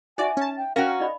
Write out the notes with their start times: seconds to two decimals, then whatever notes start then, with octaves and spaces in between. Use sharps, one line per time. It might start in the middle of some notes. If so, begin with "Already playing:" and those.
0.18 D#4 F#4 D5 E5 G#5
0.37 C#4 A5
0.57 G5
0.76 C#4 F#4 A#4 F5 G5
1.00 D#4 D5 D#5 B5